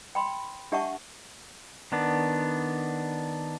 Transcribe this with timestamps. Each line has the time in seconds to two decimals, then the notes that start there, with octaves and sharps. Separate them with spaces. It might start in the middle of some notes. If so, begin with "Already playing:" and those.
0.15 G5 B5 C6
0.72 D4 G4 E5 F#5 A5 C#6
1.92 D#3 B3 D4